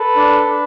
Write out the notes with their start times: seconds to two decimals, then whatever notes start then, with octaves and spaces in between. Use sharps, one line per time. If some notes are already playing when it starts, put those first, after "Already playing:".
Already playing: A4 B4
0.16 D4
0.45 D4